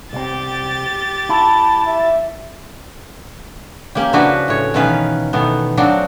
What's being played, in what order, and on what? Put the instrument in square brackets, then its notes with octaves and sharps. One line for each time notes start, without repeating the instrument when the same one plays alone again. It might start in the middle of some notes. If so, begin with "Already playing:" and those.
[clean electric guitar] C2 C4 [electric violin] G4 A6
[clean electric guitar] E4 [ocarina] A5
[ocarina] E5
[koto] A#3 C#4 G4
C#3 F3 D4 E4 F#4 B4
A2 C#5
B2 D#3 E3 C#4 B4 F5
B2 D#3 E3 A3 B3
F3 F#3 C4 D4 F#4 D5